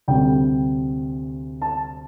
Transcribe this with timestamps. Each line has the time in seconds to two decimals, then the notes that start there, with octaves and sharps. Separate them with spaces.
0.08 D2 C3 G3 G5
1.62 A5